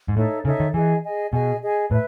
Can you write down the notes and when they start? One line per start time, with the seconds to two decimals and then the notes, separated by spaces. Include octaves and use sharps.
0.08 G#2
0.17 A2 D#4 A4 C#5 E5
0.45 C#3 D#4 A4 C#5 E5
0.60 D#3
0.74 E3 G#4 D#5 G#5
1.04 G#4 D#5 G#5
1.32 B2 G#4 D#5 G#5
1.62 G#4 D#5 G#5
1.91 A2 B4 E5